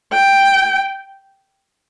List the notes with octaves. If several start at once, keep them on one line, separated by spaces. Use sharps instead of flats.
G5